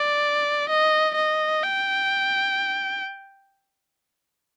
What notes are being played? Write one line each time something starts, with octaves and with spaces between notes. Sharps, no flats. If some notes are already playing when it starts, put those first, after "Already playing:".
Already playing: D5
D#5
D#5
G5